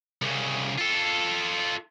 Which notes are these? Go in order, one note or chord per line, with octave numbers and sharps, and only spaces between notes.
C2 C#3
F4 A4